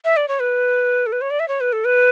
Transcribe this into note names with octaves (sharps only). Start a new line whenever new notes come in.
E5
D5
C#5
B4
A4
B4
C#5
D5
E5
C#5
B4
A4
B4